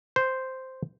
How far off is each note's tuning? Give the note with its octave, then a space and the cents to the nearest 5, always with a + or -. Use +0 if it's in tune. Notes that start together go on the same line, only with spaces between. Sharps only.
C5 -5